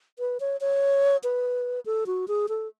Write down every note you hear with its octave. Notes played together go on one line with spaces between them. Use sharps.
B4
C#5
C#5
B4
A4
F#4
G#4
A4